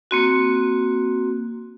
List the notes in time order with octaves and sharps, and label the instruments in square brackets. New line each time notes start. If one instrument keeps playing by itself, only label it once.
[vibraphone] A#3 C4 F#4